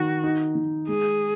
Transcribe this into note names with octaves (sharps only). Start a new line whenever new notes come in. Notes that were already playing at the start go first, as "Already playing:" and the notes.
Already playing: D#3 F#4
D#4
D#3
G#3 G#4